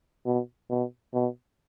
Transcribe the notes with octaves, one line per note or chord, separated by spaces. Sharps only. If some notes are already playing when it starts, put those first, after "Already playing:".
B2
B2
B2